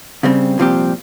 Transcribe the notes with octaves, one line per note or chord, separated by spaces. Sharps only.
C#3 G3 C4
C2 A#2 F3 C4 G4